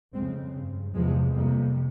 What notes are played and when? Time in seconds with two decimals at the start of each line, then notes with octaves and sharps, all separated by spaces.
0.14 F2 C#3 G#3 C4
0.54 G2
0.95 E2 C3 F3 G#3
1.35 F2 C3 G3 A#3